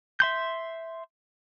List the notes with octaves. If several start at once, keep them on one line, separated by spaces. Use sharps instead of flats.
E5 C6 G6